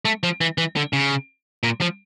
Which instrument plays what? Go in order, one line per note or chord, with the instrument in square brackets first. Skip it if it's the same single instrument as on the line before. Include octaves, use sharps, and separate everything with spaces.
[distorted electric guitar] A3
F3
E3
E3
D3
C#3
A#2
F3